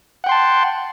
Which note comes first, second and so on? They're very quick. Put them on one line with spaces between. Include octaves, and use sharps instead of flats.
F#5 G5 C6 A5